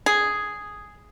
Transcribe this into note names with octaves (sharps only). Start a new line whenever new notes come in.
G#4